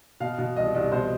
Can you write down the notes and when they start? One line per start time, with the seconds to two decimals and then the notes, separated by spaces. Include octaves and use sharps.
0.20 B2 F5
0.38 B2
0.56 C2 D#5
0.75 C2
0.92 B2 C5